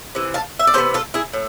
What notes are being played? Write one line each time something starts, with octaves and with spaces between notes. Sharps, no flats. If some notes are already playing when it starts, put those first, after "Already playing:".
C3 E3
F5 A5
E5
D5
C3 E3 B3 A4 C5
F4 A4
E4 G#4
A2